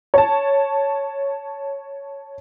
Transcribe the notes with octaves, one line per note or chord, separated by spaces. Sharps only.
C#5 A5